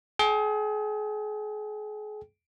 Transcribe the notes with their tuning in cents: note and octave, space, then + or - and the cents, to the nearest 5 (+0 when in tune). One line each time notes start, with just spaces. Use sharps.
G#4 +35 G5 +0